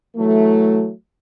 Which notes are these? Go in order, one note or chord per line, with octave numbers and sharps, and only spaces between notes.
E3 F#3 A3